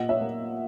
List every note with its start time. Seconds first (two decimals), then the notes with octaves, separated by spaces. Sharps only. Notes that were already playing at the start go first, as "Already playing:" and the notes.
Already playing: A#2 D#5 F#5
0.09 C#5 E5
0.21 A#3